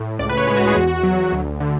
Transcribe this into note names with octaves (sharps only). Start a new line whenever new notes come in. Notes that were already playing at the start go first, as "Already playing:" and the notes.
Already playing: A2
C#2 D5
B4
C#5
G#3
F#4
G#4
E2 F#4
F#3
D2
D3